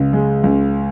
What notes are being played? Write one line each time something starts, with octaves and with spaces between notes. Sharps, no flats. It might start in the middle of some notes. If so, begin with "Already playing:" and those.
Already playing: C#2 C#3
G#3
C#2